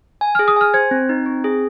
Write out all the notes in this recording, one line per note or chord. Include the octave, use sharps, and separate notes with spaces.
G#5
G#4 F6
D#6
G#5 F6
C5 G#6
C4
D#4
C4
G#4